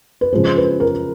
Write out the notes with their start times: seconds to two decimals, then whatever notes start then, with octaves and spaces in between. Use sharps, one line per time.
0.21 B4
0.33 C#3 F3 G#3 C5
0.57 B4
0.80 A#4